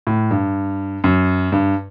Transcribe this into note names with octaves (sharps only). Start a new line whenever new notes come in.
A2
G2
F#2
G2